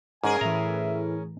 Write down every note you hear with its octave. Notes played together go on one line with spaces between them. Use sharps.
G#2 C#4 G#4 A#4 G#5
A2 E3 E5 A#5